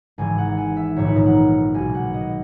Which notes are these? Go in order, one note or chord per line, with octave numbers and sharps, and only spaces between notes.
G#1 G#2 E3 G#5
F#5
G#5
E5
A#1 G#2 D#3 C#5
B4
A#4
F#5
B1 B2 G#5
F#5
D#5